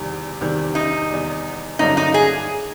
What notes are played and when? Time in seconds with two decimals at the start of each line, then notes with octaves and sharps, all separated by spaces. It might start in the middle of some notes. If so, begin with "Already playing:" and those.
Already playing: E2 C3 D#3 G3
0.41 E2 C3 D#3 G3
0.75 D#4
1.10 E2 C3 D#3 G3
1.79 G2 D3 F#3 A#3 D#4
1.97 D#4
2.14 G#4